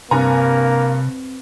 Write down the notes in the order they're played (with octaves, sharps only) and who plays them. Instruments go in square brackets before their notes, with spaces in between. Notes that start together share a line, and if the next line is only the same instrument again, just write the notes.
[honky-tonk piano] G2 G#5 A#5 [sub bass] C3 [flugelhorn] A#3 [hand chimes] C4 B4